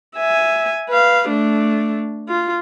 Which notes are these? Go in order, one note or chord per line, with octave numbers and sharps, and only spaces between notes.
E5 G#5
B4 F5
A3 D4
F4